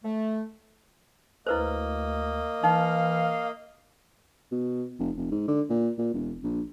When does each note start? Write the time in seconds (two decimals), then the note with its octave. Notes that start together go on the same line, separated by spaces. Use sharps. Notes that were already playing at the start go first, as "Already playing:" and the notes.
0.03 A3
1.47 D2 A#3 E4 B4 C5 D#5
2.63 E3 D#4 F5
4.52 B2
4.99 F1
5.17 F1
5.31 G#2
5.48 D3
5.70 A#2
5.98 A#2
6.14 E1
6.43 A#1